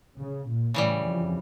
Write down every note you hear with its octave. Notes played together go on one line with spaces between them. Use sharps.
C#3
A#2
A2 C#3 E3 G3
F2